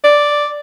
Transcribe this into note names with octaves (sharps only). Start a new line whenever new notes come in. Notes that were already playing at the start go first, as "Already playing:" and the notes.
D5